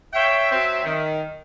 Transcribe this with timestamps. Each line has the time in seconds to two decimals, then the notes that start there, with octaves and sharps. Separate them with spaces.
0.13 C#5 E5 F5 G5
0.51 F#3 C4
0.84 D#3